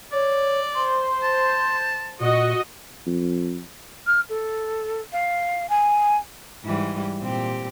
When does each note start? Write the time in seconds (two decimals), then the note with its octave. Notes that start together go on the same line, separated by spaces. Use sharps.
0.12 C#5 D5
0.75 C5 C6
1.23 A5
2.20 A#2 F#4 D#5
3.06 F2
4.06 F6
4.29 A4
5.12 F5
5.69 G#5
6.64 G#2 E3 G3
7.20 A#2 C4 G4